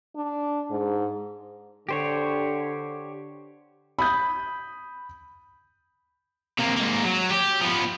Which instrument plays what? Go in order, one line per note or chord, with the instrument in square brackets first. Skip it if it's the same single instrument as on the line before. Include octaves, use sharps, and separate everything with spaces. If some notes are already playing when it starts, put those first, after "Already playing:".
[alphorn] D4
G#2
[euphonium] D3 [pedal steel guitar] G4 C5 C#5
[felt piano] B5 D#6 G6
[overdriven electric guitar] C3 A#3
G#2 A#3
F#3
G4
F3 B3